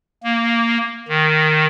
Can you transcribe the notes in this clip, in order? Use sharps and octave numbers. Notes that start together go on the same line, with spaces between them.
A#3
D#3